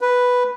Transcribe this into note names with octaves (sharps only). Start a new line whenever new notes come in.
B4